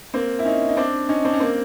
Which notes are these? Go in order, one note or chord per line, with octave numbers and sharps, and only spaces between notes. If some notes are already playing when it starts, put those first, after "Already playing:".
A#3 C4
E4
C#4 D#4
D#4
C4 D4
C#4 D#4
C4 D4
C#4
A#3 C4